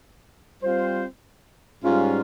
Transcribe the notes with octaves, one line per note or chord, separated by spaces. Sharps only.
G3 C4 F4 C5
G#2 G3 C#4 F4